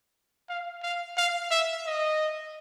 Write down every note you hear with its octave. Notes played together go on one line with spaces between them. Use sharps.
F5
F5
F5
E5
D#5